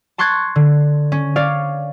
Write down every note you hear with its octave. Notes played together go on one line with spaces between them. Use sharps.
A5 C6 C#6 F#6 G#6 A6
D3
C#4
C#5 D5 F5